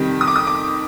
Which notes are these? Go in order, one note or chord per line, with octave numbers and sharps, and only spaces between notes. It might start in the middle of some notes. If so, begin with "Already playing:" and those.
Already playing: F2 C3 D#3 G3
D#6
D6
D#6
D6